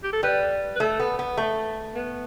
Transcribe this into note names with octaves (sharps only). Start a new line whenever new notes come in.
G4
A4
G3 B4
B4
A3 A4
B3
B3
A3
B3